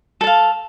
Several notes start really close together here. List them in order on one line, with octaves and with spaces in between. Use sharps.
A4 A5 F5